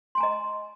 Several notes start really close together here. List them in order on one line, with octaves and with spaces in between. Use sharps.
C6 G#5 A#5 D#5